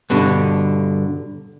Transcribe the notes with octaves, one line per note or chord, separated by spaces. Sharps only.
G2 B2 D3